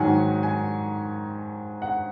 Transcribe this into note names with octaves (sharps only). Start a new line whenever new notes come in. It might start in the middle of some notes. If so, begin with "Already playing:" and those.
Already playing: G#2 D#3 F#3 F#5 G#5
G#5
F#5